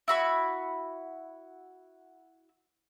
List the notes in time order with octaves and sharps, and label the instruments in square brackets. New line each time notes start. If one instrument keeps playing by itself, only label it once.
[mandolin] E4 F#4 B5